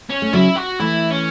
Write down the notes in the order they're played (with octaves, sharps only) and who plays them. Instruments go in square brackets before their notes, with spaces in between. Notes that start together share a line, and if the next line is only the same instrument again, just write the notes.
[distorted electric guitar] C#4
[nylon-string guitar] A3
[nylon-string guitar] C#3 F#3 [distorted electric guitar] E4
[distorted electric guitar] F#4
[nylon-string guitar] E3 A3 [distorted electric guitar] E4
[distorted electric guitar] C#4